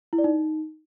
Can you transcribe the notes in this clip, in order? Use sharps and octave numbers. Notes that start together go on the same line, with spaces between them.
E4
D5
D#4